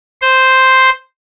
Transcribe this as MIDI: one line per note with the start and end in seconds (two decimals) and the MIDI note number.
0.22 0.90 72